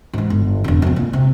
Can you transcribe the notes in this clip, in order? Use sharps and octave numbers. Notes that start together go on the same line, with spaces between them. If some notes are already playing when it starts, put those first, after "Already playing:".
G#2 E3
G1
E1 D3
F2 B2
A#2
C3